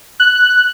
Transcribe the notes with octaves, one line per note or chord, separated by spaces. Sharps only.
F#6